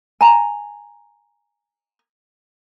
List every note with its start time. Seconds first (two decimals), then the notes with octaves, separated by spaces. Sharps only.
0.21 G#5 A#5